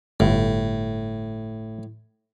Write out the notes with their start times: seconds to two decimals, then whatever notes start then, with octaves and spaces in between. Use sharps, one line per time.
0.20 G1 A2